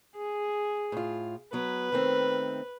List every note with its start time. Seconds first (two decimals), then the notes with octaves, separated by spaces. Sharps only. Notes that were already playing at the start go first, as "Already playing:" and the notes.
0.16 G#4
0.92 A2 F4
1.53 F#3 B3 B4
1.92 D#3 A3 C4